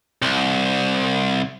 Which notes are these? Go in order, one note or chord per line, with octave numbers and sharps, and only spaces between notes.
C2